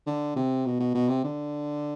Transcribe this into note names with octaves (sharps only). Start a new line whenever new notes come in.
D3
C3
B2
B2
B2
C3
D3